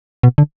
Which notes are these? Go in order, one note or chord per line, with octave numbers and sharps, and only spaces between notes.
B2
D3